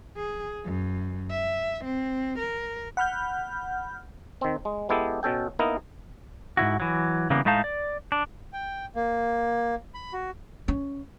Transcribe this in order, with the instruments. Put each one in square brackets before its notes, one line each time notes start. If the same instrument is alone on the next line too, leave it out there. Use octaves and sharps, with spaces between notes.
[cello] G#4
F#2
E5
C4
A#4
[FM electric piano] F#5 B5 F6 G6
[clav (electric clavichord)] D#3 C4
G#3
G#3 B3 E4 G4 A4
B2 C#4 A4 G5
A#3 B3 D#4 E4 A#4
[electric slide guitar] G#2 C#3 E4 F#4
E3 F#3
C#3 E3 G3 A#3 B3
A2 G#3 A3 D#4 F5 A5
D5
D4
[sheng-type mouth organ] G5
A#3
B5
F#4
[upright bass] C#4